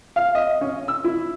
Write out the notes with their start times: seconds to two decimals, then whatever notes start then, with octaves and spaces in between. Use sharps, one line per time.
0.16 F5
0.35 D#5
0.61 C#4
0.88 E6
1.04 E4